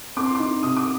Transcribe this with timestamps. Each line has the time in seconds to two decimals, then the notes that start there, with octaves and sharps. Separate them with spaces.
0.17 C4 D6
0.26 C6
0.35 D#4 D6
0.63 C3 D#6
0.77 D6